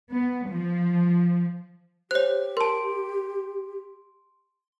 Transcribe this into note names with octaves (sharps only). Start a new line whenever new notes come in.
B3
F3
G4 C5 C#5 F#6
A#4 A5 C6 D7